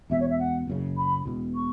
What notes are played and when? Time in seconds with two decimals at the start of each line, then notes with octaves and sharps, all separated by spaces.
0.10 E1 E2 B2 E5
0.20 C#5
0.30 E5
0.39 F#5
0.67 F#1 F#2 C#3
0.97 B5
1.25 E1 E2 B2
1.54 C#6